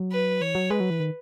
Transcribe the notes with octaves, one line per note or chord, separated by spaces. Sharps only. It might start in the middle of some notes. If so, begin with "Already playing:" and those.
Already playing: F#3
B4
E3 C#5
F#3
G#3 B4
F#3
E3
D#3